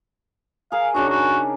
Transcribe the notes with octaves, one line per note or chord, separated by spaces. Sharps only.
G#4 A#4 F5
C#3 D4 D#4 F#4
F#4